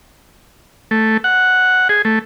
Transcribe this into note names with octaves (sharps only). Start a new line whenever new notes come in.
A3
F#5
G#4
A3